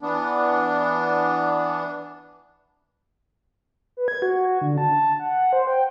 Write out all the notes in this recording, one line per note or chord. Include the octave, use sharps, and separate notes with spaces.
E3 B3 D4
B4
G#6
F#4
D3
A5
F#5
C5
G5